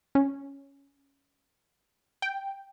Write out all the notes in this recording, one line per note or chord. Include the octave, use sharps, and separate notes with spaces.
C#4
G5